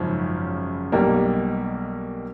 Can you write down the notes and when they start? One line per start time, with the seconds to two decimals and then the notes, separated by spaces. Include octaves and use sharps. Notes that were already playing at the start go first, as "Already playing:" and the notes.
Already playing: G#1 F#2 C#3 F3
0.92 B1 B2 G3 A#3